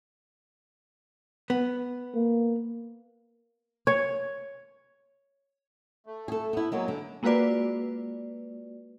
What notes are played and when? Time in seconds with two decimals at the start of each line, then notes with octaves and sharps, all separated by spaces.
1.50 B3
2.14 A#3
3.87 C#5
6.06 A3
6.28 G#4 A4
6.53 B3 E4
6.72 F#3 G#3 A#3 B3
6.88 D3
7.23 G#3 A#3 F4 F#4 B4 D5